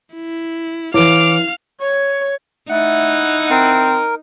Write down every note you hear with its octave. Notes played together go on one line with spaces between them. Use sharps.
E4
E3 E4 B4 C#5 F5 D6 F6
C#5
A3 D#4 E4 F#5
C4 A#4